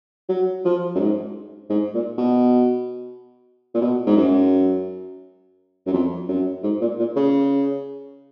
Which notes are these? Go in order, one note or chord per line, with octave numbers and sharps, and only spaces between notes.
F#3
F3
F#2
G#2
G#2
A#2
B2
A#2
B2
G#2
F#2
F#2
F2
F#2
G#2
A#2
A#2
C#3